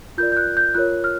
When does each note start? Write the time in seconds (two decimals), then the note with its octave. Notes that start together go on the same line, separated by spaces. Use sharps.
0.18 F4 A#4 D5 G6
0.32 G6
0.37 F#6
0.57 G6
0.75 F4 A#4 C#5 F#6
1.04 F6